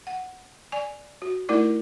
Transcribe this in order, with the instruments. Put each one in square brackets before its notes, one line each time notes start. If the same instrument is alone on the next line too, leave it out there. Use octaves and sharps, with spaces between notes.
[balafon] F#5
D5 G#5
F#4
A3 D#4 E4 A#4 D5